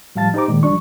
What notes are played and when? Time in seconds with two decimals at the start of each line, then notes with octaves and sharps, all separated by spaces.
0.15 A2 F3 G3 F5 A5 A6
0.34 D#4 G4 C5 A#5 D6
0.48 A#2 D#3 G#3
0.63 C2 F3 G3 D4 C#6